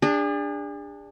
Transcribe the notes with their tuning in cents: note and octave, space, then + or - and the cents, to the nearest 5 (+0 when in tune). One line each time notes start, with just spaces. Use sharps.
D4 +0 G#4 -40